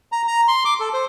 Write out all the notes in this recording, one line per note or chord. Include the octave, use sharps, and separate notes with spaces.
A#5
A#5
C6
D6
A4
C5